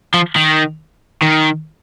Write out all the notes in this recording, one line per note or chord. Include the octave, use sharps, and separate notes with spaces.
F3
D#3
D#3